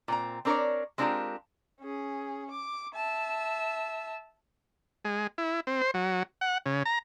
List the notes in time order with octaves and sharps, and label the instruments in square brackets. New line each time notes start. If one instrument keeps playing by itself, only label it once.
[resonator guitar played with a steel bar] A#2 C4 A#5
C4 D4 A#4 B4 C#5 D5
G#3 C4 D4 F4 G4 A#4
[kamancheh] C#4 G#4
D6
E5 A5
[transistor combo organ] G#3
E4
C4
C5
F#3
F#5
C#3
A#5